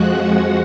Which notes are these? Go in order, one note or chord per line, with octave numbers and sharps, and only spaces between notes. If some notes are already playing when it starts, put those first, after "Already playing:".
Already playing: F2 F3 G#3 F#4 F#5